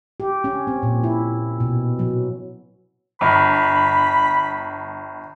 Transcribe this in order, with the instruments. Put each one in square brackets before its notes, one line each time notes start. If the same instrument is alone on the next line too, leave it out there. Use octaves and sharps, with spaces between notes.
[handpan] G4
C#4
C4
A#2
E4
B2
F#3
[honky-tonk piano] G1 [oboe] B5